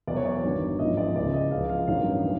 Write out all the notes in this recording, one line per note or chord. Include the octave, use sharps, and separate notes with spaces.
E2 B2 F#3 D5
C#5
D5
G1 G2 D#3 F#3
A1 G#2 F3 D#5
D5
C#2 C#3 E3 D5
D#5
C#2 C#3 F3 F5
F5
A1 G2 D#3 F#3 F5
E3